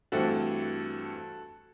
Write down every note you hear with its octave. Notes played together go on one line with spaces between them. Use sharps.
G2 E3 A3 C4 F#4 A4